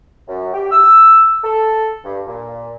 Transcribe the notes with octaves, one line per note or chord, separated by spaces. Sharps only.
F#2
G4
E6
A4
G2
A#2